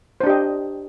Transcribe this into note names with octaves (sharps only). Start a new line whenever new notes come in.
D4 G4 C5 D#5